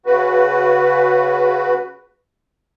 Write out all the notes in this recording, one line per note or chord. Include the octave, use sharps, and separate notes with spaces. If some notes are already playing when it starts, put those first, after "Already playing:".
C#3 F#4 B4